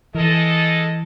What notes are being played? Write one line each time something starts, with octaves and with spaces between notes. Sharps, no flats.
E3 G#3 A4 D#5